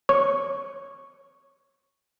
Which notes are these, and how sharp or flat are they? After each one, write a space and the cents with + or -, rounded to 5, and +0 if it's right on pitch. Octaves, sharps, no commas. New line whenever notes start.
C#5 +0 C#6 +0